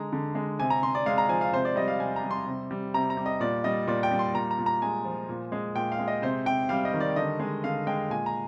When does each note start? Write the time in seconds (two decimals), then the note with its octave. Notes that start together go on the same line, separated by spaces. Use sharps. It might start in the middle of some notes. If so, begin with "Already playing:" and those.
Already playing: D3 G#3 A#5
0.13 D3
0.35 G#3
0.59 C3 G#5
0.70 A#5
0.83 C3 C6
0.95 D5
1.06 G#3 F5
1.18 A#5
1.29 F3 G#5
1.41 F5
1.52 C3 C5
1.65 D5
1.76 G3 D#5
1.88 F5
2.00 C3 G#5
2.16 A#5
2.24 G3
2.31 C6
2.46 C3
2.71 G3
2.94 C3 A#5
3.10 A#5
3.17 G3
3.26 D#5
3.40 A#2 D5
3.64 G3 D#5
3.87 A#2 D5
4.03 G5
4.11 G3
4.19 C6
4.34 A#2 A#5
4.51 A#5
4.59 A#2
4.66 A#5
4.82 G#3 G#5
5.05 F3
5.29 A#2
5.52 G#3
5.75 A#2 G5
5.92 F5
5.99 G#3
6.08 D#5
6.22 C3 C5
6.46 C3 G5
6.69 G3 F5
6.85 D#5
6.94 D#3
7.00 D5
7.16 D3 D#5
7.40 G#3
7.64 D3 F5
7.87 G#3 G5
8.10 A#2 G#5
8.26 A#5